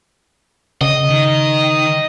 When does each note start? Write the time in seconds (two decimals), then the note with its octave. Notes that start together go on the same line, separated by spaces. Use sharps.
0.81 C#3 D#5
1.10 D#3